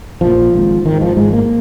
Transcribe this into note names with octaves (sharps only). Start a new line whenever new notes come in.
A#1 A#2 F3
G#1 G#2
G#1 G#2 D#3
F3
G#1 G#2 G#3
A#3